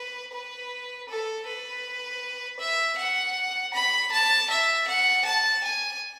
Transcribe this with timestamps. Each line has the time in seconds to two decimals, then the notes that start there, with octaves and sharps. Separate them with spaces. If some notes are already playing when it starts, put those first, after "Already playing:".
Already playing: B4
0.33 B4
1.09 A4
1.47 B4
2.60 E5
2.98 F#5
3.74 B5
4.12 A5
4.50 E5
4.88 F#5
5.25 A5
5.64 G#5